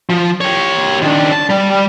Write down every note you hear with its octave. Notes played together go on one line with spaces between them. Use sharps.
F3
G4 C#5
D#3 D4
A5
G3